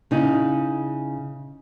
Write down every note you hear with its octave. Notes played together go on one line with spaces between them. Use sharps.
C#3 D#4 E4